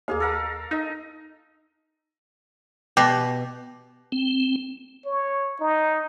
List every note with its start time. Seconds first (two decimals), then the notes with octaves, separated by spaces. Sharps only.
0.08 D#2 A#3 G#4 F5
0.20 A4 A#4 F5
0.71 D#4 D#5
2.97 B2 G4
4.12 C4
5.06 C#5
5.60 D#4